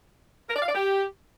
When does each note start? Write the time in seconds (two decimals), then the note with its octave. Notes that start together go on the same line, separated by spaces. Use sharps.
0.50 A#4
0.56 D5
0.62 F5
0.69 D5
0.75 G4